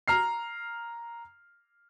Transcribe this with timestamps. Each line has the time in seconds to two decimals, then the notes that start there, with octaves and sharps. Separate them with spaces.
0.08 A#5 F6 C7